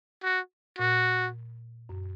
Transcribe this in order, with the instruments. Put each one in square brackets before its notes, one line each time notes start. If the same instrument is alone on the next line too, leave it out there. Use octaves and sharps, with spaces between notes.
[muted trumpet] F#4
[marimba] A#2 [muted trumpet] F#4
[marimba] F#2